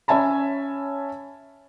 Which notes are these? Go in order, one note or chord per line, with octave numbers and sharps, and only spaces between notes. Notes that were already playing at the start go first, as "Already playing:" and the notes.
C#4 C#5 E5 G#5 A5 B5